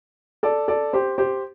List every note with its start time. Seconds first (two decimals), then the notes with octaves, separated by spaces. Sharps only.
0.43 A4 D5
0.68 A4 D5
0.93 G4 C5
1.18 G4 C5